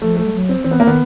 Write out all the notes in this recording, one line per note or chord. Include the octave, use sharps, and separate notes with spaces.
F3 A3
A3
G3
F#3
C4
E3 C4
B3
A#3
D#3 B3